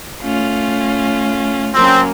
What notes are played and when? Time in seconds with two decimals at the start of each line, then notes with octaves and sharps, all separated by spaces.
0.22 A3 C#4 F4
1.75 F#3 A#3 C4 C#4